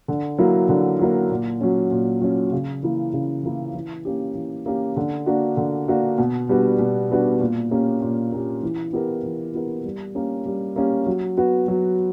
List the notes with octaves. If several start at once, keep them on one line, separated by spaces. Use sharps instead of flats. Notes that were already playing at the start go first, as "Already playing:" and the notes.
D3
F#3 A#3 E4 A#4
D3
F#3 A#3 E4 A#4
A#2
F#3 C#4
A#2
F#3 C#4
C#3
E3 A#3 E4
C#3
E3 A#3 E4
E3
A#3 C#4 G4
E3
A#3 C#4 G4
D3
A#3 D4 F#4
D3
A#3 D4 F#4
B2
G3 B3 D4 F#4
B2
G3 B3 D4 F#4
A#2
A#3 C#4 G4
A#2
A#3 C#4 G4
E3
B3 E4 G4 A#4
E3
B3 E4 G4 A#4
G3
A#3 C#4 G4
G3
A#3 C#4 G4
F#3
B3 F#4
F#3